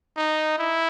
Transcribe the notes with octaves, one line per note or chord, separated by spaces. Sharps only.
D#4
E4